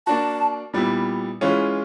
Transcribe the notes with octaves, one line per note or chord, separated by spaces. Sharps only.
A#3 D4 F#4 A5
A#2 G3 B3 E4
E3 G#3 C#4 F4